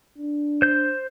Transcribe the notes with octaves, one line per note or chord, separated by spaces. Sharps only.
D4
C5 G6